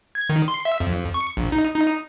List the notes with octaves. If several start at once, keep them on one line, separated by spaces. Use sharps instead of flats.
G#6
D#3
C6
E5
F2
C#6
A#1
D#4
D#4